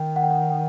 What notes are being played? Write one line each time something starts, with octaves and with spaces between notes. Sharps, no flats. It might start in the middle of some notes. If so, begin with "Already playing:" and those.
Already playing: D#3 G5
F#5
G5
F#5
G5